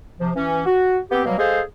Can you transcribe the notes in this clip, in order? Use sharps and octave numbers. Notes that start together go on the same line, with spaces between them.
C3 F3
E3 C#4
F#4
B3 C4 G4
B2 F#3 G3 A#3
G#3 G#4 A4 C5 F5